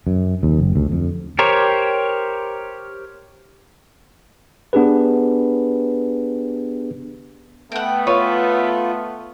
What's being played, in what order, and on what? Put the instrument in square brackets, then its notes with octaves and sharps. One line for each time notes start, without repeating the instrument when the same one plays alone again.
[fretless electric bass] F#2
D#2
F#1
D2
F2
[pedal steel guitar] G4 A#4 C5 C#5
[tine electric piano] B3 D4 G4 G#4 B4
[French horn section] A3 B3 [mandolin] F#5 G5
[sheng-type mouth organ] F4 [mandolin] B4 [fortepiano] C#5